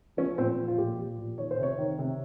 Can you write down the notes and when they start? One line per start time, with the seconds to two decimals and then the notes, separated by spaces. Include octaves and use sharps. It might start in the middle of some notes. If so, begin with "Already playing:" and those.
0.17 F3 C#4
0.38 A#2 C4
0.57 F3
0.68 F4
0.78 A#2 G4
0.98 F3
1.19 A#2
1.38 D#3 C#5
1.51 C5
1.58 C3
1.63 C#5
1.78 D#3
1.99 C3